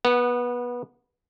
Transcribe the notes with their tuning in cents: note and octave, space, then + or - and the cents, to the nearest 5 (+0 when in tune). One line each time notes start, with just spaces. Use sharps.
B3 -20 F#5 +5